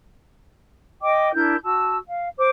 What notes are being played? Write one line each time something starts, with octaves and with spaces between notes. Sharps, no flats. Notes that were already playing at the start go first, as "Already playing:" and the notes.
D#5 G5 D6
D4 E4 A#4 G6
F#4 A5 E6
F5
C5 D6